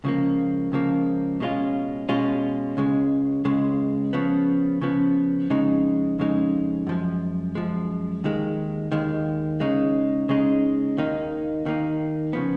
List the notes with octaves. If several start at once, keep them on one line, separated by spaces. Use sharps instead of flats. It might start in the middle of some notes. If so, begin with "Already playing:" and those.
C#2 C#3 F3 A#3
C#2 C#3 F3 A#3
B2 G#3 C#4 F4
B2 G#3 C#4 F4
C#2 C#3 G#3
C#2 C#3 G#3
C#3 F3 B3
C#3 F3 B3
F2 C#3 G#3 D#4
F2 C#3 G#3 D#4
F#2 F3 G#3
F#2 F3 G#3
D#2 D#3 G#3
D#2 D#3 G#3
C#3 G#3 D#4
C#3 G#3 D#4
D#2 D#3 A#3 D#4
D#2 D#3 A#3 D#4
C#3 F3 B3